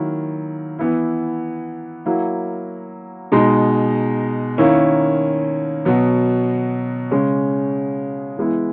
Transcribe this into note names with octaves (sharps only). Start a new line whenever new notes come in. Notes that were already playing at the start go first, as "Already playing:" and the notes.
Already playing: D#3 F#3 A#3 E4
E3 B3 E4
F#3 A#3 E4
B2 G#3 D#4
D#3 A#3 C#4 E4
B2 F#3 B3
C#3 G#3 C#4
E3 G#3 B3 E4